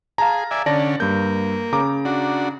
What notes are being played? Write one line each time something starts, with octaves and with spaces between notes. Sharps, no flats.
G#4 F5 A5 A#5
D5 E5 G#5
D3 C#4 D5 A5 A#6
G2 A#3 G6
C#3 A#5 D6
D4 F#4